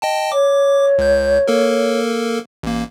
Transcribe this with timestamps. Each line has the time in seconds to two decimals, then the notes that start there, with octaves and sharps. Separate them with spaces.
0.02 D#5 G5 A5
0.32 C#5 D6
0.98 C#2 G6
1.48 A#3 A4 A#4
2.63 A1 A#3